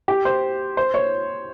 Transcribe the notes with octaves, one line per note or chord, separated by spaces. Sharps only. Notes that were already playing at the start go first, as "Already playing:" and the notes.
G4
C5
C5
C#5